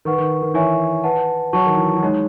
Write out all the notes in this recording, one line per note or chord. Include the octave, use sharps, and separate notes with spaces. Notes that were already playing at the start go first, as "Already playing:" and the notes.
D#3 B4 F#5 C#6
D#3
D#3
E3 C#5 E5 G#5 C#6
B4 F#5 A5
F#3 C#5 F#5 A5 C#6
D#3
E3
F#3
G#3 D#4 G#4 C#5